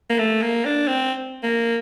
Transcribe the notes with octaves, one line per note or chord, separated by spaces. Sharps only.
A#3
A3
A#3
D4
C4
A#3